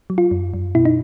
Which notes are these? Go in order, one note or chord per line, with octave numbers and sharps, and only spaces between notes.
F#3
F4
F#2
F#2
B2 E4
D#4